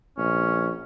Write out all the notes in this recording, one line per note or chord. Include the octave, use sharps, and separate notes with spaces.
A#1 C#4